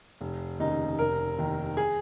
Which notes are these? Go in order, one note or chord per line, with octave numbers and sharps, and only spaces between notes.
F1
D#2 C#3 D#4
F1 A#4
D#2 D#3
G#4